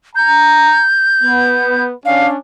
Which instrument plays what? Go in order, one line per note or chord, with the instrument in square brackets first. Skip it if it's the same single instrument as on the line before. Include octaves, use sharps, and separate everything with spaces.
[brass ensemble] A#5 [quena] G6
[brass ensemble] B3
[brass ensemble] C#4 D4 [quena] F5